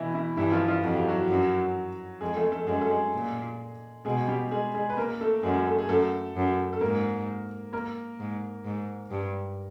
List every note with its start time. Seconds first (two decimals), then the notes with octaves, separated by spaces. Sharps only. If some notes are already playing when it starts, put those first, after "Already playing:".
Already playing: B2 E3 E4
0.14 E3 E4
0.37 G2 E3 E4
0.52 F3 F4
0.68 F3 F4
0.83 F2 F#4
0.96 G4
1.08 F#3 F#4
1.29 F#2
2.21 F2 G#3 G#4
2.37 A3 A4
2.52 A3 A4
2.67 F#2 G#3 G#4
2.81 A4
2.90 G#3 G#4
3.13 A#2
4.05 B2 G#3 G#4
4.28 G3 G4
4.51 G#3 G#4
4.74 G#3 G#4
4.90 B4
4.97 A#3 A#4
5.21 A3 A4
5.43 F#2 G#3 G#4
5.67 A3 A4
5.79 G#4
5.89 F#2 A3 A4
6.36 F#2
6.73 A4
6.81 G#2 A#3 A#4
7.73 A#3 A#4
8.19 G#2
8.65 G#2
9.11 G2